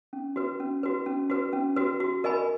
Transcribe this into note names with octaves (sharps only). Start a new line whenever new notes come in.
C#4
F#4 B4
C#4
F#4 B4
C#4
F#4 B4
C#4
F#4 B4
F#4
A#4 D#5 G#5 B5